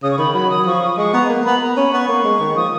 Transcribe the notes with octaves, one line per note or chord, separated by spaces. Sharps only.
C#3 D#6
C#6
D#3 B5
F#3 B5
D#6
F3 C#6
D#6
G#3 C#6
B3 A#5
A#3
B3 B5
A#5
C#4 B5
B3 C#6
A#3
G#3
D#3
F3 D#6